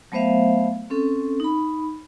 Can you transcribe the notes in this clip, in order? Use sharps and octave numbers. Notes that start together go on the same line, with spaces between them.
F#3 A3 B3 C5 E5 F5
C4 C#4 A4
D#4 B5